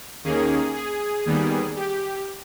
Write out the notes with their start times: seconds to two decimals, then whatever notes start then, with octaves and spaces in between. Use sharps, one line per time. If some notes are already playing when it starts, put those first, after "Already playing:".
0.24 D#2 D#3 A#3 C#4 G#4
0.74 G#4
1.25 D#2 D#3 G3 B3
1.76 G4